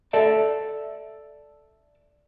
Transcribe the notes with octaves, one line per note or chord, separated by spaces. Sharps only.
A4 D5 E5 A5